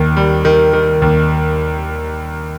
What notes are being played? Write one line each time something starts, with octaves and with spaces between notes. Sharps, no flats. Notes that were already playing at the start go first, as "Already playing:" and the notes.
Already playing: D#2 D#3
G3
D#3
D#3
D#2